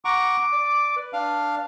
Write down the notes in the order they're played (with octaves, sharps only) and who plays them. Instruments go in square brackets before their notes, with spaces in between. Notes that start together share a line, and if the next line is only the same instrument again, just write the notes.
[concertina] F#5 A#5 C#6 [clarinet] D6
[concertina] D5
[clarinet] B4
[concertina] D4 F5